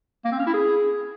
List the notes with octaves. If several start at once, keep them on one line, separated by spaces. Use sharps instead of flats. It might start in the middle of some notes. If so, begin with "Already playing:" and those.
A#3
C4
C#4
E4
G#4